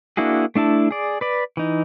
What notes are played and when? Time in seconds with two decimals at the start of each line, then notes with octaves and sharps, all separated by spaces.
0.17 A#3 D4 E4 F#4 G#4
0.55 A3 D4 E4 A5
0.91 G#4 D5
1.21 B4 D5
1.57 E3 D#4